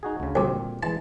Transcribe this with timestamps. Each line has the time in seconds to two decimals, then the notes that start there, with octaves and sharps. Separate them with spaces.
0.03 D#4 F#4 G#4
0.20 D2 C#3
0.36 D2 G2 A#2 C4
0.83 E3 G#3 A5